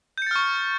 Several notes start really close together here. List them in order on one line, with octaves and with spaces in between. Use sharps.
G6 C#7 A6 F6 C#6